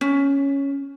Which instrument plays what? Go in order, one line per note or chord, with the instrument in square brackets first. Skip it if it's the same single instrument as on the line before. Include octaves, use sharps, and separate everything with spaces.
[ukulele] C#4